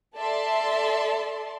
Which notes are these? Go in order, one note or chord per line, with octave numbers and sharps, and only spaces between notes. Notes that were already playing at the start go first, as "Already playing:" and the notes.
A4 D5 E5 A5 C6